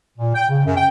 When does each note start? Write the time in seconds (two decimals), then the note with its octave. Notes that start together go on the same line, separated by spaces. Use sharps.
0.18 A#2
0.35 G5
0.49 C#3
0.65 F#2
0.77 G5